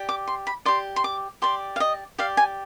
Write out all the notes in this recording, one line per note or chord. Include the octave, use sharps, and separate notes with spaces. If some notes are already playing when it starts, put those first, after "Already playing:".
Already playing: G4 D5
D6
C6
B5
G4 D5 C6
C6
D6
G4 D5 C6
F5
D#5
G4 D5 F5
G#5